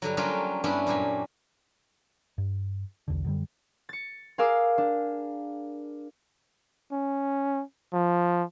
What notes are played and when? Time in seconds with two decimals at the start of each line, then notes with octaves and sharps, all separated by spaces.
0.02 G2 D3 F#3
0.17 F#3 G3 A#3 C#4 D4 F4
0.64 G2 B3 C#4 D4 E4
0.86 F#2 A#2 G4 G#5
2.38 G2
3.08 B1 E2 D3
3.24 F#2 D3 G3
3.89 A6 C#7
4.38 G#4 A#4 F5 D6 E6
4.78 D4
6.92 C#4
7.93 F3